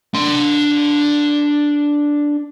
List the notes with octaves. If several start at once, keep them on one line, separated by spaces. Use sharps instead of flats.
D4 C6